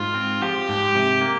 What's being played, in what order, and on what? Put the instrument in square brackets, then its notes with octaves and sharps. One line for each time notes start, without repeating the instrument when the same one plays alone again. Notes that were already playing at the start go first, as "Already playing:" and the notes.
Already playing: [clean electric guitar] G#2 [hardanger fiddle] F4
[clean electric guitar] C4
[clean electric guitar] F3 [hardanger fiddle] G4
[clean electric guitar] G#2
C3
A#3